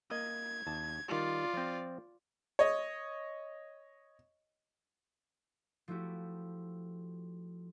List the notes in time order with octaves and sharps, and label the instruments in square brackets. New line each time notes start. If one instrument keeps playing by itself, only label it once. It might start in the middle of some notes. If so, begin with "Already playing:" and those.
[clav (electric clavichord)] A#3 D#5 [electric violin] G#6
[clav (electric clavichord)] D#2 A5
[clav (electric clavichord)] D#3 G3 [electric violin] F4 D5
[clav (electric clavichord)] F3 C4
[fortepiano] C#5 D#5
[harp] F3 A3 E4 F#4 G4